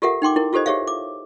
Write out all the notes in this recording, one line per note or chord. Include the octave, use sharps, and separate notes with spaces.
F4 G4 A4 A#4 E5 F#5
D#4 G5 C6 D6
E4 A#4
F4 G4 A4 C5 D#5
G4 G#4 C#5 E5 F5
D6